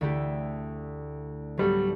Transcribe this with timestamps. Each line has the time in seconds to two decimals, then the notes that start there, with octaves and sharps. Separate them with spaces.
0.01 D2 D3 A3 E4 G4
1.57 A2 F#3 G3 B3 F#4 A4